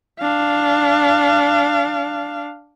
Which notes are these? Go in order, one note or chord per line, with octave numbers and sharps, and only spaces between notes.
D4 F5